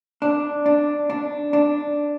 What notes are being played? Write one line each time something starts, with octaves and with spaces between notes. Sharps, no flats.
D4
D4
D4
D4